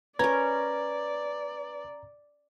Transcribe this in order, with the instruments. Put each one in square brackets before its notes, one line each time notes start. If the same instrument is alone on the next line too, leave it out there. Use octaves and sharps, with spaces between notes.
[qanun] C#4 A#4 [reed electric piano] B4 [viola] D5 [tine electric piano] A#5 G#6